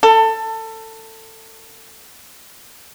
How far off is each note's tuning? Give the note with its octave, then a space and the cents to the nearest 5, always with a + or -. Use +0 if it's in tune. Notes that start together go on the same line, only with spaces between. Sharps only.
A4 +20